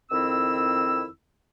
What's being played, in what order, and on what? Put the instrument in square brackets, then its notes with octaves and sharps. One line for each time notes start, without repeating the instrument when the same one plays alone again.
[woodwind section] F2 D#3 C4 E4 E6